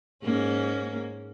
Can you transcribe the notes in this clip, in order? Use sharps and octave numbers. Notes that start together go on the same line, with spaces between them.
G#2 A#3 C#4